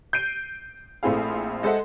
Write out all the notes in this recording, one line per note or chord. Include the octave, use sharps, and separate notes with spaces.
G6 C7 D7 D#7
A#1 A3 C4 E4 G#4 F5
G#3 A4 C5 D#5 E5 F#5